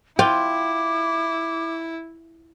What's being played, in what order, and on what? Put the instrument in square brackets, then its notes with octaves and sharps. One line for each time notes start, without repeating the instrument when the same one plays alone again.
[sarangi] E4 [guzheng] F4 [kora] G5 [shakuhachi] D6